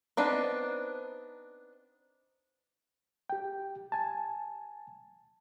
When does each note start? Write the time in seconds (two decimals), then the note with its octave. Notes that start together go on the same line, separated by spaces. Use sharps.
0.17 B3 C4 D4 D#4
3.30 G4 G5
3.92 G#5 A5